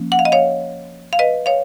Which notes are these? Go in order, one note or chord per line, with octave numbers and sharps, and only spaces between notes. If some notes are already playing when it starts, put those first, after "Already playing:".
Already playing: F3 A#3 C#4
F#5
F5
D#5
C#5 F5
F5
B4 D#5
C#5 F5